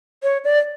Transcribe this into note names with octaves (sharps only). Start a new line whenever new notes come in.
C#5
D5